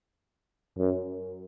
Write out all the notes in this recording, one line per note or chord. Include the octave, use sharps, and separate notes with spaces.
F#2